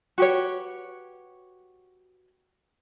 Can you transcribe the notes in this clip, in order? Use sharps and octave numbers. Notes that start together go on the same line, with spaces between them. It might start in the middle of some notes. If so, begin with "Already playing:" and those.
F#4 G4 B4 C#5